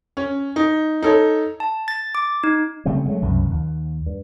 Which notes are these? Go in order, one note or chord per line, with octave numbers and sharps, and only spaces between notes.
C#4
D#4
D#4 A4 C#5
A5
A6
D6
D#4
C#3 G3 A3 C4
F#3 G#3 A3 B3
C2 F#2 B2
D#2
G2